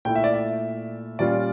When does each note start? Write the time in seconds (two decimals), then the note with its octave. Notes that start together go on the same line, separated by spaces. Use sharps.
0.05 A#2 A3 E4 G5
0.15 E5
0.24 D5
0.34 E5
1.19 A#2 G3 C#4 F4 D5